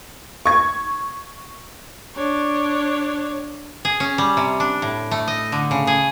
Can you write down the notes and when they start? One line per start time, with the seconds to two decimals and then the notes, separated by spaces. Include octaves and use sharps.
0.46 C#6 G#6
2.16 D4 C#5
3.85 G#4
4.00 C#4
4.18 G3
4.37 C3
4.60 D4
4.82 A2
5.11 A3
5.27 D#5
5.52 D3
5.71 C#3
5.87 G#4